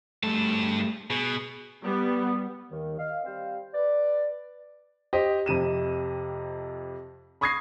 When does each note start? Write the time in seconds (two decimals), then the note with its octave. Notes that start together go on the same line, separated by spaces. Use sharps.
0.23 G2 G3 A3 A5
1.10 B2 G#4
1.82 G3 B3
2.70 D#2 D#3
2.98 D#5 F5
3.25 G3 C4 C5 F5
3.74 B4 D5
5.13 G4 C5 D#5
5.46 F2 C3 D#7 E7
7.41 B5 C#6 D#6 G#6 A#6 C7